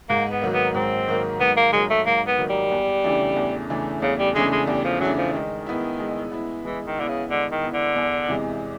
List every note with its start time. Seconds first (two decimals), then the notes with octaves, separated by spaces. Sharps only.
0.09 G#2 A#3
0.31 B3
0.42 D#3 F#3 A#3
0.53 B3
0.74 G#2 C4
1.08 D#3 F#3 A#3
1.40 G#2 B3
1.57 A#3
1.73 D#3 F#3 G#3 A#3
1.90 A3
2.06 G#2 A#3
2.28 B3
2.39 D#3 F#3 A#3
2.50 G3
2.72 E2
3.04 C#3 E3 A3 D4
3.36 E2
3.70 C#3 E3 A3 D4
4.02 E2 C#3
4.19 G3
4.35 C#3 E3 G#3 A3 D4
4.52 G#3
4.67 E2 G3
4.84 F3
5.00 C#3 E3 F#3 A3 D4
5.17 F3
5.33 D#3 G#3
5.66 B3 E4
5.99 G#3
6.32 B3 E4
6.64 E3 G#3
6.87 D#3
6.97 D3 B3 E4
7.08 C#3
7.30 D3 G#3
7.52 D#3
7.63 B3 E4
7.73 D3
7.96 E2
8.28 C3 E3 G#3